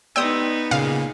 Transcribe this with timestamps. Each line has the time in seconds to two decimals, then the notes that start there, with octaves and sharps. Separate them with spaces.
0.16 B3 D#4 G4 D5 G5 D#6 E6
0.71 A#2 C#3 F5